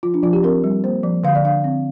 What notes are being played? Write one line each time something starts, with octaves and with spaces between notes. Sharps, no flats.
F3 F4
D4
F3 F4
G4
C4 A#4
G3
A#3 C5
F3
D3 F5
D5
D4 F5
C4